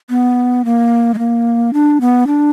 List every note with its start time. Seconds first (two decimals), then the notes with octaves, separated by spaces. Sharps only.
0.10 B3
0.65 A#3
1.14 G#3
1.18 A#3
1.73 D4
2.01 B3
2.27 D4